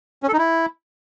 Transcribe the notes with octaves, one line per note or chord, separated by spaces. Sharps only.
C#4
A4
D#4
E4